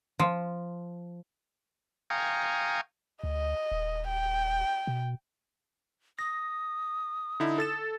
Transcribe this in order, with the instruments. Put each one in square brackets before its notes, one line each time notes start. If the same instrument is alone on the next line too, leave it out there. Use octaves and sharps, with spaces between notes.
[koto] F3
[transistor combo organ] F5 G5 G#5 A#5 C#6 D#6
[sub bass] D2 [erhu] D#5
[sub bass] D#1
[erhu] G5
[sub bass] B2
[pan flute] D#6 [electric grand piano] A#6
[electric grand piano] D3 D#4 E4
A4 A6 E7